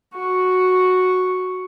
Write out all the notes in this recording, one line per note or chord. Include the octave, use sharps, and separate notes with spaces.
F#4 C#6